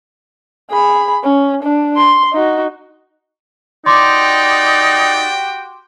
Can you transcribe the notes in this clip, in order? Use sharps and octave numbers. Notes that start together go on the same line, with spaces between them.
G#4 B5
C#4
D4
C6
D#4 F#4
D#4 F#4 G4 D5 G5 C6 D6